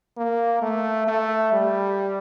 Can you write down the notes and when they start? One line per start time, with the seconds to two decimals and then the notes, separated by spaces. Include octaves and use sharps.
0.17 A#3
0.62 A3
1.08 A3
1.52 G3